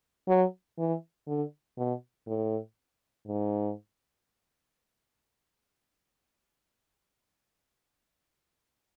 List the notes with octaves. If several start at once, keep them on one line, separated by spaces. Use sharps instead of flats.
F#3
E3
D3
B2
A2
G#2